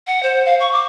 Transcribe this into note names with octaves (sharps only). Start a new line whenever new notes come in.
F#5
C5
F5
C#6
D6